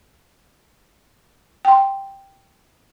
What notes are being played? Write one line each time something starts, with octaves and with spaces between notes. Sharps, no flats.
G5 C6